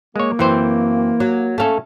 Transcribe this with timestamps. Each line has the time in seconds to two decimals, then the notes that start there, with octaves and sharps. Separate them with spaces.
0.16 G#3 A#3 C#5
0.39 F#2 E3 C4 C5
1.20 F#3
1.58 A3 C#4 A4 F5 A5